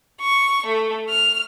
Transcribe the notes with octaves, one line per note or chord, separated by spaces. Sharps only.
C#6
A3
F6